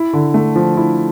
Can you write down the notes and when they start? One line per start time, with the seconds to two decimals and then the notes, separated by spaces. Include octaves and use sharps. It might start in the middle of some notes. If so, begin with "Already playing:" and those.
Already playing: E4
0.13 D3
0.34 A3
0.56 F3
0.77 E4